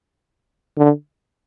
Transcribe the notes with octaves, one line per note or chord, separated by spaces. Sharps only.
D3